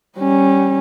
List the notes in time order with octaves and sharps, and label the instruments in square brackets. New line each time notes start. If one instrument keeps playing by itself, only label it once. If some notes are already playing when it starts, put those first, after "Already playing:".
[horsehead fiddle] G3 C#4